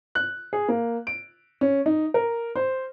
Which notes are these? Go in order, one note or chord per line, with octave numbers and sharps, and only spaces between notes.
F#6
G#4
A#3
D7
C#4
D#4
A#4
C5